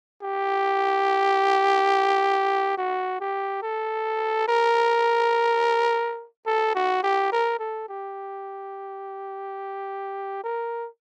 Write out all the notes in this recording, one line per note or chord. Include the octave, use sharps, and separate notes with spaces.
G4
F#4
G4
A4
A#4
A4
F#4
G4
A#4
A4
G4
A#4